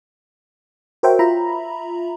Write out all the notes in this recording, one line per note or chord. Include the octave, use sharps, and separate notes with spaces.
F#4 A#4 C5 C#5 E5 G5
F4 E5 A#5 B5